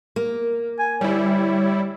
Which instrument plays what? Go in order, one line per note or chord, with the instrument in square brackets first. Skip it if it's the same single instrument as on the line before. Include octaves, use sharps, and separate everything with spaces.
[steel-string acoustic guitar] A#3
[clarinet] G#5
[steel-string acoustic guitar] D2 [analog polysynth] G3 E4 [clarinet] C#5